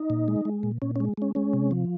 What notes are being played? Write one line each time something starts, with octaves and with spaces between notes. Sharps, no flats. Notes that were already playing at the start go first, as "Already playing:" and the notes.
Already playing: D#4
A#2
G#3
G#3
A#2
A#2 C#4
C#4
G#3
G#3 C#4
G#3 C#4
C3
F3